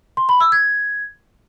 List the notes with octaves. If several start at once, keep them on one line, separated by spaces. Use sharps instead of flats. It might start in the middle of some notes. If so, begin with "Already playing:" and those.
C6
B5
E6
G#6